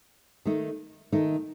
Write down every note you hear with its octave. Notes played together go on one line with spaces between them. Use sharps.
D#3 A3 D#4
D#3 A3 D#4